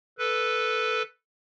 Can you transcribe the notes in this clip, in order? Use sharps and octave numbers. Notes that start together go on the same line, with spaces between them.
A4 B4